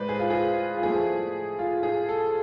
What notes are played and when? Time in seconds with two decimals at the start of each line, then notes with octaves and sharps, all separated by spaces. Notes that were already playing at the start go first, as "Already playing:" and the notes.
Already playing: A2 G#3 B4 C5 D5
0.09 G#4
0.19 F4
0.30 G#4
0.77 F4
0.83 F3 A3 E4 G#4
1.59 F4
1.83 G#4
2.09 A4